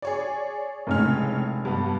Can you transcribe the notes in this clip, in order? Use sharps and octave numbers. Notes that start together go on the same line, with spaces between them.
G#4 C#5 D5
F1 A2 C#3 G#3 C#4 F6
G2 B3